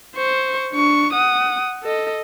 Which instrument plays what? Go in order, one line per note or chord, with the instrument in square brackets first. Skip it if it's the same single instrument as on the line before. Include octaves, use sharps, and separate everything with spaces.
[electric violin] C5 C#6
D4 C#6
F#5 D#6
A4 D#5